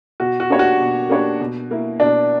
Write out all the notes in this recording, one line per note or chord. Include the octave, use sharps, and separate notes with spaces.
B2 F#4
F#4
A#3 D4 G4 C#5
F#4
B2
A#3 D4 G4 C#5
B2
A#3 E4
B2 D4